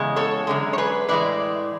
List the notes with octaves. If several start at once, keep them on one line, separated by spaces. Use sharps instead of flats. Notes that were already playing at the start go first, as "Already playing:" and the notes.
Already playing: E2 C#3 G#3
A4 C#5
F#2 D3 G#3
C#5
G#4 B4
A2 E3 G#3 B4 D5